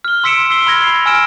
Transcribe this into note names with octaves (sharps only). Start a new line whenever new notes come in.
F6 G7
C6 E6 B6 C#7 D7 E7
E6 C7 G7
B5 F6 G#6 A#6 G7
B5 C7
G#5 E6 F6 D7 E7